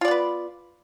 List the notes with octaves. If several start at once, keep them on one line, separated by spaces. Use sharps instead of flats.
B3 F4 B4 D5